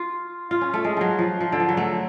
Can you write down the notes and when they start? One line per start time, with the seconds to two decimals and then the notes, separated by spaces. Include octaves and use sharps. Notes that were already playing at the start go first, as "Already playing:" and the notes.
Already playing: F4
0.51 F4
0.61 C#4
0.73 A3
0.85 G#3
0.97 F3 F#3
1.19 F3
1.40 F3
1.52 D3
1.60 F3
1.69 F#3
1.77 A3